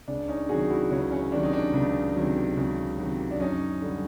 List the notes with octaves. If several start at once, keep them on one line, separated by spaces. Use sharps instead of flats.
C#2 D4
C#4 D#4
C3 D#3 F#3 F#4 G#4
E4 F#4
C#2 C#4
C#4
C3 D#3 F#3 D4
D#4
D4
C#2
C3 D#3 F#3
C#2
C3 D#3 F#3
D4
F#2 C#4 D#4
D3 G3